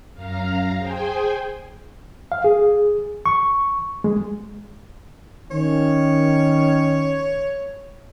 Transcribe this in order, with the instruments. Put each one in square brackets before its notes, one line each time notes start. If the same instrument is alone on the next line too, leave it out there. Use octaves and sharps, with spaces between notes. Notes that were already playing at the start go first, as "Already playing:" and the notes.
[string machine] F#2 F5 A#5
G#4 C5 G5 G#5
[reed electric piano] F5
G#4
C#6
G#3
[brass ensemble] D#3 C#4 [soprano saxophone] C#5